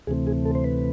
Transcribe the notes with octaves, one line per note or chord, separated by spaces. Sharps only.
D2 C3 E3 A3 C4 G#4
G#4
A4
C5
B4